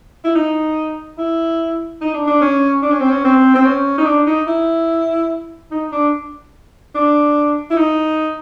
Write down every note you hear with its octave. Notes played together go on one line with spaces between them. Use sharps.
E4
D#4
E4
D#4
D4
D4
C#4
D4
C#4
C4
C#4
C4
C4
C#4
D#4
D4
D#4
E4
D#4
D4
D4
E4
D#4